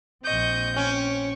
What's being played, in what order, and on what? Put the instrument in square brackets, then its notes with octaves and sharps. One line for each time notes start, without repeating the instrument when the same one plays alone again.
[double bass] A#1 C4 [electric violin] D#5 C#6 [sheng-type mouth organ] G6
[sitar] C#4 [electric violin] G5 C#6